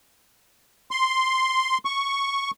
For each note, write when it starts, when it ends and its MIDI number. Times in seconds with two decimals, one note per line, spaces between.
0.91 1.78 84
1.85 2.51 85